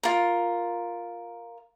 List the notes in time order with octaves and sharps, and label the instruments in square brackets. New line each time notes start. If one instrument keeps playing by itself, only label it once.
[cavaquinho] F4 A#4